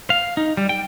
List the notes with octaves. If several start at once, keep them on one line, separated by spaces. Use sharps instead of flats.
F5
D#4
G3
G5